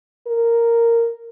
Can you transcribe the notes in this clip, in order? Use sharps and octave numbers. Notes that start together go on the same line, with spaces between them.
A#4